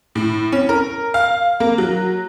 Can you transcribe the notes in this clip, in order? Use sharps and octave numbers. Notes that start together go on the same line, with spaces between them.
A2
C#4
A#4
F5
A#3
F#3